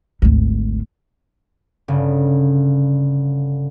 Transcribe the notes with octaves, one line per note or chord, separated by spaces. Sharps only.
G#1 D2
G1 C#3